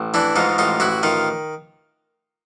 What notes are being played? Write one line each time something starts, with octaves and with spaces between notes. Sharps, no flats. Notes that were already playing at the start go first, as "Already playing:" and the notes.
Already playing: A1
E3 D4 E4
G#2 D#4 F4
A1 D#4 F4
A1 E4 F#4
D#3 D#4 F4